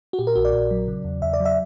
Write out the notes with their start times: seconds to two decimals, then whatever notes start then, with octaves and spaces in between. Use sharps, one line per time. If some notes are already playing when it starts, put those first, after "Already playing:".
0.13 F#4
0.19 A#2 G4
0.27 A#4
0.36 A#1 F#4
0.45 D5
0.53 A#1
0.71 F#3
0.88 C#3
1.05 E2
1.22 E2 E5
1.33 D5
1.40 F#3
1.45 E5